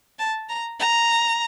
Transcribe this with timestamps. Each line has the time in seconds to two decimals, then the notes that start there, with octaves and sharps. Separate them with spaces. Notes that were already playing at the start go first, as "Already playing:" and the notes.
0.19 A5
0.49 A#5
0.80 A#5